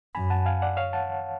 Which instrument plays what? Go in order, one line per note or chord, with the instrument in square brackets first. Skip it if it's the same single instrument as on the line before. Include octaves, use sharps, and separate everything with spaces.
[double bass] F#2 [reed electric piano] G#5 B5
[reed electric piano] F#5 A5
F5 G#5
D5 F#5
C#5 F5
F#5 A5